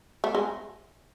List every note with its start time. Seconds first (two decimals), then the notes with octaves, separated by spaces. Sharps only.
0.24 A3
0.35 G#3